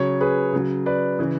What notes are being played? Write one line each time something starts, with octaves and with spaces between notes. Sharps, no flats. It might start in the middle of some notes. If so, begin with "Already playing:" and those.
Already playing: C#3 F#3 C#5
G#4 B4
C#3 F#3
B4 D5
C#3 E3